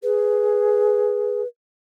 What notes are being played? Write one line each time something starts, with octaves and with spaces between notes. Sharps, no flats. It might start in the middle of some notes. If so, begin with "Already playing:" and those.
G#4 B4